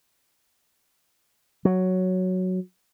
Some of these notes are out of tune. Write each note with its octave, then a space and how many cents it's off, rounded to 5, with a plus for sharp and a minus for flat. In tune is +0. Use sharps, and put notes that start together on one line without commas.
F#3 +0